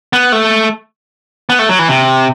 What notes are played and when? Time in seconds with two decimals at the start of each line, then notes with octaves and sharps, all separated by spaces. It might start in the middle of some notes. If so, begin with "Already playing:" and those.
0.13 B3
0.32 A3
1.49 B3
1.59 A3
1.69 F#3
1.79 E3
1.89 C3